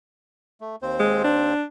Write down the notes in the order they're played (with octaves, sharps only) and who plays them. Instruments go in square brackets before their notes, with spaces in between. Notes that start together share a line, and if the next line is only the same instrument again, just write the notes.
[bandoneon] A3
D#2 C4 C5
[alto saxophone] G#3
D4